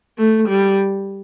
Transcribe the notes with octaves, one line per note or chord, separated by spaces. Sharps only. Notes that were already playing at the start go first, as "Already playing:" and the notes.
A3
G3